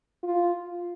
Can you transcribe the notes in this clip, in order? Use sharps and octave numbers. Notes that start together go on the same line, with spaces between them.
F4